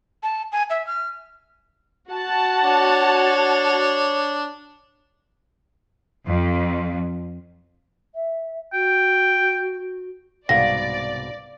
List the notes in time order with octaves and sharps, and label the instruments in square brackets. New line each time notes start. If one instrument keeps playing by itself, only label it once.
[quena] A5
G#5
E5
F6
[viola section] F#4 F#5 A5
[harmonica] D4 C#5
[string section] F2
[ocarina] E5
[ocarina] F#4 [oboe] G5
[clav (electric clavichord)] C2 G#2 B2 [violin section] D5 [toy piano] F5 F#5 [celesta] A#6